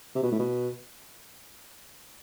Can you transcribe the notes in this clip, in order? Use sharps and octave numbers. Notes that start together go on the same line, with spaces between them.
C3
B2
A2
B2